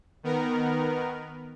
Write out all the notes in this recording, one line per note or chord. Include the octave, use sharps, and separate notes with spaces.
D#3 B3 A#4